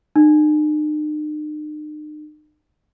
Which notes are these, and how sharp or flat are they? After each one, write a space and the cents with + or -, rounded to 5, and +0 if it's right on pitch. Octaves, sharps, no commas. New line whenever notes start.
D#4 -45